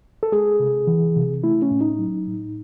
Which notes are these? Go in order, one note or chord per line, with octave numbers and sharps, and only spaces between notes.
A4
G#3 G#4
C3
E3
C3
A3 E4
C#4
A2
D#4
F#3
A2